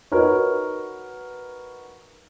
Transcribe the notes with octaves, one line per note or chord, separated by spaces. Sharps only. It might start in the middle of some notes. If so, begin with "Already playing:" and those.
D#4 F#4 A#4 B4 C#5